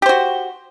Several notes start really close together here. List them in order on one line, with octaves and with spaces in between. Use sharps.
G4 C5 F#4